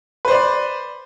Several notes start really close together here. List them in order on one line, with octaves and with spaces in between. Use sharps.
B4 C5 D5